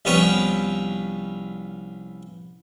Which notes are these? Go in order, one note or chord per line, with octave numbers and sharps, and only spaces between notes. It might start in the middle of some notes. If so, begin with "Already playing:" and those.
C2 F3 B3 C#4 G5 C#6